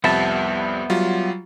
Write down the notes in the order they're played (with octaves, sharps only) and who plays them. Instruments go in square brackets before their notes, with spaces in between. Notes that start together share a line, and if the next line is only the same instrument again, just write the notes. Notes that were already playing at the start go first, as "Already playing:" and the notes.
[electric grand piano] C2 F2 G3 [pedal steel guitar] B3 E5 A5
[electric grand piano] F#3 G3 F4